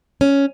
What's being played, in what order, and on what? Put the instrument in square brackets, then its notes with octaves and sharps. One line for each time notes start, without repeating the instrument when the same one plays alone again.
[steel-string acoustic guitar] C#4